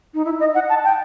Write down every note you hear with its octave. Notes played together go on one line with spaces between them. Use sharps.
D#4
E4
D#5
F#5
A5
G5